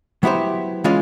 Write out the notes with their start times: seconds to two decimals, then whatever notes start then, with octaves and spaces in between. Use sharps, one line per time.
0.23 F#3 B3 E4 G4 C5
0.84 E3 G#3 C#4 F4